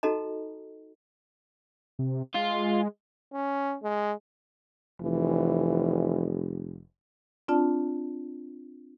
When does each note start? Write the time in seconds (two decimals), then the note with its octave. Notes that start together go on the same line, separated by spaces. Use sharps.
0.03 D#4 F#4 A4 D#5 A#5
1.99 C3
2.34 G#3 F4
3.33 C#4
3.83 G#3
5.02 F1 E3
7.48 C4 D4 F4 D5 A5